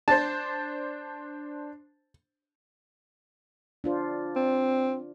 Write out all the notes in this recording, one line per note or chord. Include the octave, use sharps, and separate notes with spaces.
D4 C5 A5
D4 F4 C5
C4